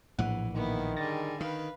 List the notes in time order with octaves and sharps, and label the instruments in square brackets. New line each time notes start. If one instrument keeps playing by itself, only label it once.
[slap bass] A#1 E3 [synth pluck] A2 F#5
[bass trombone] D#3 [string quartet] A#3 B3 E4
[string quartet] D3 G3 G#4 [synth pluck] A6 A#6
[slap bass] D#3 [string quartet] B4 F5